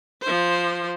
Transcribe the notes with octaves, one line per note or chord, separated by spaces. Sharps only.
F3 C5